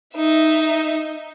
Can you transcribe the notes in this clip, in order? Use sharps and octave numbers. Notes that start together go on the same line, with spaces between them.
D#4 E5